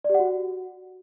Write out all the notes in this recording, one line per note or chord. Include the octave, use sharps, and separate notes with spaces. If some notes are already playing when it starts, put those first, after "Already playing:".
D5
G4
F#5
F#4